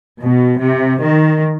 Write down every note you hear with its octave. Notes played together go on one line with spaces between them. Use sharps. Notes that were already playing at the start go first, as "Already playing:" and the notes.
B2
C3
D#3